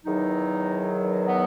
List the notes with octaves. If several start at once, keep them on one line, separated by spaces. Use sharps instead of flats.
E2 D#3 F#3 D#4
B3